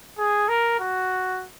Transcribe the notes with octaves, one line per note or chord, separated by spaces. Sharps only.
G#4
A#4
F#4